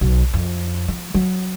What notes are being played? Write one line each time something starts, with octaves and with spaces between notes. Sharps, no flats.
B1
F2
F3
F#3